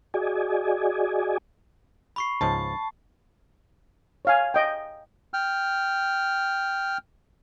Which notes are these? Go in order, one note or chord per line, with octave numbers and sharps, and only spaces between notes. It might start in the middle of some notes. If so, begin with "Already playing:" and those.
F#4 G#4 D5 D#5 G#5
B5 C#6 C7
C#2 G#2 F3 A5
C#5 F5 G#5
D#5 G5
G5 F6